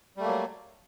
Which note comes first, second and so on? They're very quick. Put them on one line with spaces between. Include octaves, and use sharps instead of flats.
G3 A3 A#3 F#3